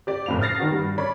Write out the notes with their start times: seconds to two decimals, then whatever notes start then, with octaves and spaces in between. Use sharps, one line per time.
0.07 G4 D5
0.26 F#1 F2 A2 F5 F7
0.40 D#6 F6 A6 A#6 C7
0.59 D#3 B3 D4 F#4
0.71 G2 G3
0.98 D4 C#5 D5 B5